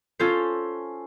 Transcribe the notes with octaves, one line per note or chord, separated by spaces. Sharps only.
C#4 F4 A4 C5